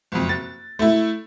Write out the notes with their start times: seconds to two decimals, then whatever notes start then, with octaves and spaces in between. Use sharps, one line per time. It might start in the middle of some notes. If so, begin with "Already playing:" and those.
0.12 F#1 F2
0.29 A6
0.79 A3 E4